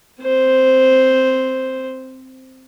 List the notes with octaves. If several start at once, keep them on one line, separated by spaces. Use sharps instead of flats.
C4 C5